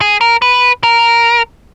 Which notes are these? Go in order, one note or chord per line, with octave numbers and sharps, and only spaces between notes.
G#4
A#4
B4
A#4